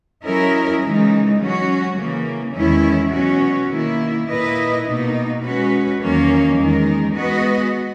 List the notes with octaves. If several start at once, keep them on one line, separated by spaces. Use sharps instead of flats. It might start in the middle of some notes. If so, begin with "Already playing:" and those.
F#3 C#4 E4 A#4 D#5
C#3 E3 G#3 D#4
F#3 C#4 F#4
C#3 E3 A#3
E2 D#3 G#3 C#4 E4
B2 F#3 C#4 F#4
D#3 A#3 E4
A#2 A#3 E4 B4 D#5
B2 A#3 D#4
G#3 C#4 F#4 B4
E2 D#3 F#3 A#3 C#4
E2 D#3 G#3 D#4 A#4
G#3 B3 F#4 B4 D#5